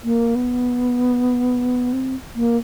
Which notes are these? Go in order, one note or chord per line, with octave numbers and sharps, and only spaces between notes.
A#3
B3
C4
A#3